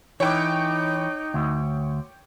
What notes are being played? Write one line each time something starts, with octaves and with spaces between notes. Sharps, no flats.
E3 D#4 C#5 G5 D6
D2